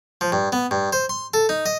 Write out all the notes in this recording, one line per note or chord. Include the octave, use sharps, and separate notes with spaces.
F3
G2
B3
G2
C5
C6
A4
D#4
D#5